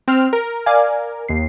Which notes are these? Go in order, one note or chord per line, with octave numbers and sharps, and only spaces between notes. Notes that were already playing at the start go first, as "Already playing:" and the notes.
C4 F6
A#4
D5 F5 G#5
D#2 C7